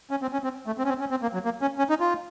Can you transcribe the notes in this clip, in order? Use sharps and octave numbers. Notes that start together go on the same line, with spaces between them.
C#4
C4
C#4
C4
A3
C4
C#4
C4
C#4
C4
A#3
F#3
A#3
C#4
C#4
D#4
F4